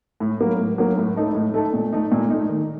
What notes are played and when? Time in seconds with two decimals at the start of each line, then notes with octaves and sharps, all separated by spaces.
0.20 A2
0.41 F#3 A#3
0.59 A2
0.78 F#3 A#3
0.98 A2
1.16 A3 D#4 A4
1.35 A2
1.54 A3 D#4 A4
1.73 A#2
1.93 A3 D#4
2.12 A#2
2.30 A3 D#4
2.49 D#3